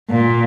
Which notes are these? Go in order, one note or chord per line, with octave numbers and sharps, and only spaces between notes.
A#2